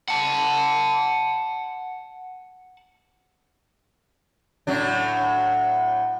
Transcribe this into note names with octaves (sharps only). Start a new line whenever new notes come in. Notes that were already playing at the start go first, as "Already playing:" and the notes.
F#5 A5
A2 F#3 D4